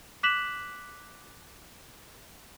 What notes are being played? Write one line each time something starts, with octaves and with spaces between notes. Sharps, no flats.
D6 F#6 B6 E7 F#7